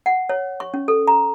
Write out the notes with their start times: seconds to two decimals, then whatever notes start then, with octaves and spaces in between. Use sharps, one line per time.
0.06 F#5
0.29 C#5
0.60 C#6
0.74 C#4
0.88 A4
1.07 A#5